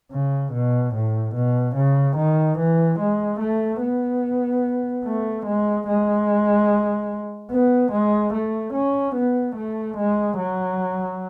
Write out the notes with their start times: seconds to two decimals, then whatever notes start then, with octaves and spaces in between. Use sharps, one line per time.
0.12 C#3
0.53 B2
0.94 A2
1.35 B2
1.76 C#3
2.16 D#3
2.58 E3
2.99 G#3
3.40 A3
3.82 B3
5.04 A3
5.46 G#3
5.87 G#3
7.51 B3
7.92 G#3
8.33 A3
8.73 C#4
9.16 B3
9.56 A3
9.97 G#3
10.38 F#3